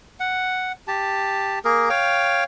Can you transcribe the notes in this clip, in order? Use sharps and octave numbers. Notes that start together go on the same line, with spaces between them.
F#5
G4 A5
A#3 G#4 A#4
C#5 F5 G5